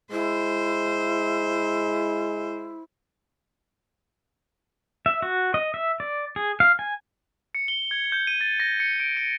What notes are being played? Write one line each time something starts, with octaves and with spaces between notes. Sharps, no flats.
G#3 E4 C5
E5
F#4
D#5
E5
D5
G#4
F5
G#5
C#7
G7
G#6
G6
D#7
A6
A#6
C#7
D7
D#7